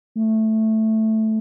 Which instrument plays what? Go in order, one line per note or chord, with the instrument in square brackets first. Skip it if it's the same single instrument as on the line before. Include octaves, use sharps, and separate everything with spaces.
[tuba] A3